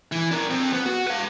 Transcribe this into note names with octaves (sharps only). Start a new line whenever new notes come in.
E3
D4 A#4
F2 C4
B3
F#4
B4 F5